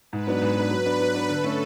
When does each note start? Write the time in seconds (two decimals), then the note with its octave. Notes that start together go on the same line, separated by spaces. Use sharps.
0.12 G#2 B4
0.27 F#3 B3 D4
0.41 G#2 B4
0.56 F#3 B3 D4
0.71 F#3
0.86 B3 D4
1.00 F#3 B4
1.14 B3 D4
1.29 D3 A4
1.44 A3 C#4